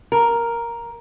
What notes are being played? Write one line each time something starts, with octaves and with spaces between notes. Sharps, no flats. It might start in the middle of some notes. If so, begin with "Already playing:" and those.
A#4